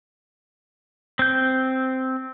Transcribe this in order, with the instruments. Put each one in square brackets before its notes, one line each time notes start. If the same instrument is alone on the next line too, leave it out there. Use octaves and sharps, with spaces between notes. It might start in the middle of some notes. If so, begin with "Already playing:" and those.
[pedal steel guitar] C4 G6